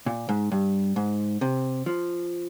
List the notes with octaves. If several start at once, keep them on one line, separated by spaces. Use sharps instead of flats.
A#2
G#2
G2
G#2
C3
F3